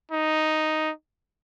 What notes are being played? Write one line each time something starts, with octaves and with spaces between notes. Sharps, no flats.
D#4